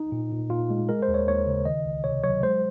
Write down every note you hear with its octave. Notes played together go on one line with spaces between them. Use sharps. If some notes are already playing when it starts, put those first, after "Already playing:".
Already playing: D#4
A#2
A#2
A#2 F4
G#3
G#3 A#4
C5
D#2
C#5
D#2 C#5
C#3
D#3 D#5
C#2
C3 C#5
F#3 C#5
G#3 C5